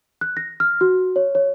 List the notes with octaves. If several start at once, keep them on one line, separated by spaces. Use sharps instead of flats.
F#6
A#6
F6
F#4
C#5
C#5